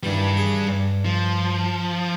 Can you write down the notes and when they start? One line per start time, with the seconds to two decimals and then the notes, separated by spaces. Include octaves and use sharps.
0.03 G2 D#3 E3 G3 D4
0.37 G#4
0.67 G2
1.05 F3